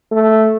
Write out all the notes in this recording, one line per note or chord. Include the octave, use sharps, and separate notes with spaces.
A3